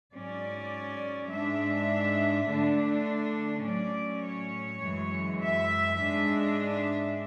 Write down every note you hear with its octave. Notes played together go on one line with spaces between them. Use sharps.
G#2 F#3 C#4 D5
G#2 G#3 D4 E5
D3 A3 D4
A2 F#3 C#4 D5
C#5
F#2 E3 G#3
E5
G#2 G#3 D4
E5